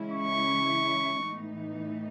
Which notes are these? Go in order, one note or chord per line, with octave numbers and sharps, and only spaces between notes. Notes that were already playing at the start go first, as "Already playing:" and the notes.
Already playing: C#3 E3 G#3 C#4 E4
C#6
A2 E3 B3 D#4